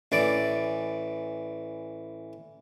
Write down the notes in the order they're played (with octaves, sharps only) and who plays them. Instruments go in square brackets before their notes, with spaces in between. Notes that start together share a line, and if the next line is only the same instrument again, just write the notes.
[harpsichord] A1 E3 D5